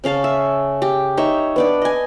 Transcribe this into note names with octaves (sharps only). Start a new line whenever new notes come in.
C#3 C#4 F5 A5
E5
G4
D#4 C#5 E5
B3 D4 D5
D#5 G#5